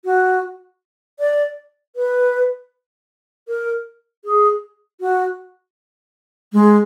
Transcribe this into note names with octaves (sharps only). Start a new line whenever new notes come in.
F#4
D5
B4
A#4
G#4
F#4
G#3